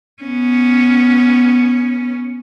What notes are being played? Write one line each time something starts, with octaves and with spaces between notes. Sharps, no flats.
B3 C#4